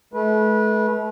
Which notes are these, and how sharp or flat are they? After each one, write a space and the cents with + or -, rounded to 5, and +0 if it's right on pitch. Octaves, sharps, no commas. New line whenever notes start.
A3 -40 B4 -25